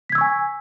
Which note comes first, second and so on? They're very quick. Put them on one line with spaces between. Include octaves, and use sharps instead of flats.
B6 G#6 E6 C#6 G#5